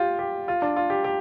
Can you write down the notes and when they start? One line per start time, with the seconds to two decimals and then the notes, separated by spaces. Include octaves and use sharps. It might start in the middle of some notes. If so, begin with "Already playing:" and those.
Already playing: F4 G4
0.19 G4
0.48 F4
0.62 D4
0.76 F4
0.90 G4
1.04 G4